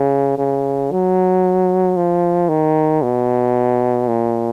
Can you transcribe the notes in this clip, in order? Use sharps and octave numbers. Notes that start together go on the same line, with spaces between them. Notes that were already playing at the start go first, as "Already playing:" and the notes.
Already playing: C#3
C#3
F#3
F3
D#3
B2
A#2